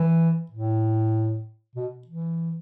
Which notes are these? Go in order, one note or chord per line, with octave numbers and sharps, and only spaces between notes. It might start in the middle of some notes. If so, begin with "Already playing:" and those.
Already playing: E3
A2
B2
E3